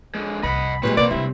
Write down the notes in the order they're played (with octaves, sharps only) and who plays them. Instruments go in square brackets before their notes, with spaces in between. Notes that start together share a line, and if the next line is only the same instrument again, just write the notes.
[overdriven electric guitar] D3 G#3
[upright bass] C2 F2 [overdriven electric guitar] D#5 F#5 [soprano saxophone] B5
[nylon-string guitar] A#2 G3 G#3 [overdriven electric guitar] C4 C#5 [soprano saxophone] B4
[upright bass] B2 E3 [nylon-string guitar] A#3 B4 [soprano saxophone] D5
[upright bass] C3 G#3 [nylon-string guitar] G3 [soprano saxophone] E4